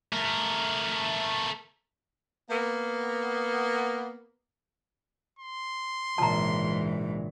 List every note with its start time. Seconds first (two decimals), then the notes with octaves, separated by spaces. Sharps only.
0.13 A3 A#4
2.49 A#3 B3
5.39 C6
6.18 A#1 G#2 C#3 E3 F4 A5 A#5